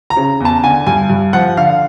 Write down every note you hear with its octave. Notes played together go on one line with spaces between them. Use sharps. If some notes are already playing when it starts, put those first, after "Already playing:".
A#5
C#3
E2 A5
D3 G#5
G2 G#5
G2
F3 F#5
D3 F5